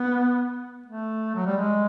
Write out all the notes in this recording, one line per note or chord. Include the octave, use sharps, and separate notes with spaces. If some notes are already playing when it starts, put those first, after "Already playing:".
Already playing: B3
A3
F#3
G3
G#3